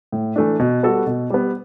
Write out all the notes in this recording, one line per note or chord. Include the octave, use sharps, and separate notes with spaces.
A2
E3 A3 D4
B2
G3 B3 F#4 A4
B2
G3 B3